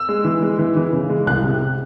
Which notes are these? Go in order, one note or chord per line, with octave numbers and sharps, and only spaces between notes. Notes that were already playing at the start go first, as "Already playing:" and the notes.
Already playing: E6
G#3
E3
G#3
E3
E3
C#3
G#3
C2 F#6
C3